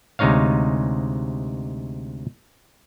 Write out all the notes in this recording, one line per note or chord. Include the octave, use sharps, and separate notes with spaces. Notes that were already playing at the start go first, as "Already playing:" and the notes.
D2 C3 G#3 D#4 C#5 F5